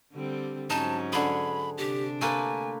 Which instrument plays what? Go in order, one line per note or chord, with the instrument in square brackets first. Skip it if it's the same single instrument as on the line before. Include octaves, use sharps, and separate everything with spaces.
[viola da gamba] D3 G3 C4
[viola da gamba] G#2 F#3 C#4 [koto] D#4 [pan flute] A5
[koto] D3 G#4 [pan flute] B5
[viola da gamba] C3 D4 [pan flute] G4
[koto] A3 A#3 B4 [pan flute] G#5